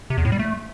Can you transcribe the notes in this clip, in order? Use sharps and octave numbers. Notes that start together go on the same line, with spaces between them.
C3
E2
A2
G3
A3